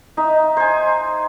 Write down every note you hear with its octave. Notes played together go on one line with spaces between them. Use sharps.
D#4 E5
C5 G#5